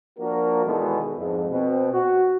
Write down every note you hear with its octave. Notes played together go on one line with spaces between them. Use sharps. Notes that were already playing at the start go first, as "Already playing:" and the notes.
F3 A#3 D4 F#4 A#4
E2 B2 D#3 G#3 B3 A4
F2 G#2
B2 C4
F#4